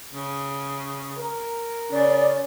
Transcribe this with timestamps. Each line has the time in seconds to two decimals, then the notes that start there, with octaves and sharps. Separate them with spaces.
0.12 C#3
1.18 A#4
1.91 C#3 C#4 D5